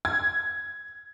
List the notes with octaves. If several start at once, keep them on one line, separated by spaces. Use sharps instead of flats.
G#6